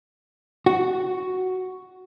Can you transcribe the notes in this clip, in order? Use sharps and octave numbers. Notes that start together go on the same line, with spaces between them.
F#4